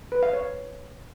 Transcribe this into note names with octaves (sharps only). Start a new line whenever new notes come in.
B4
F5
C#5